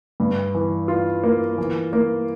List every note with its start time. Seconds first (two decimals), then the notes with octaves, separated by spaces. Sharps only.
0.20 G2
0.55 E3
0.88 F4
1.24 A#3
1.58 E3
1.93 A#3